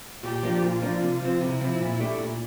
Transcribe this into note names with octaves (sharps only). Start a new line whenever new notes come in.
A#2 G4
F3 A#3 D4
A#2 F4
F3 A#3 D4
C3
F3 C4
C3 E4
F3 C4
A#2
A3 D4 G4
A#2